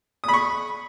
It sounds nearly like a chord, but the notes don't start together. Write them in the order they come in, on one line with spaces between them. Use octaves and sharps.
D#6 B5 C#6